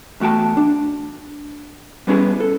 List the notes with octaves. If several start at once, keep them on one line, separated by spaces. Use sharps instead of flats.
E2 A3 F#4 G5 A5
D4
G3 B3 C#4 E4 G#4
A4